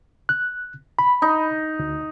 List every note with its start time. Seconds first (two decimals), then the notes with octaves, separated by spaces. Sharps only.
0.29 F#6
0.99 B5
1.22 D#4
1.79 D2